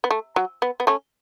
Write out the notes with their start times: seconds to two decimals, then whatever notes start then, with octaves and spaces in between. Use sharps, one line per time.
0.04 B3
0.11 A3
0.36 F#3
0.62 B3
0.80 B3
0.87 A3 C#4